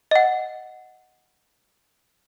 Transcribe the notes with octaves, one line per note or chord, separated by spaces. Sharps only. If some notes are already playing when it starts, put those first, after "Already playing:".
D#5 F#5